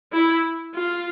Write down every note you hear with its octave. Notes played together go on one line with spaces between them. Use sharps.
E4
F4